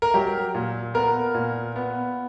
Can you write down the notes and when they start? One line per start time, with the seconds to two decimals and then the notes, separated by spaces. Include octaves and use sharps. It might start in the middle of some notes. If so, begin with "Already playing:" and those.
0.02 A#4
0.14 F#3 G4
0.55 A#2
0.94 B3 A#4
1.34 A#2
1.76 B3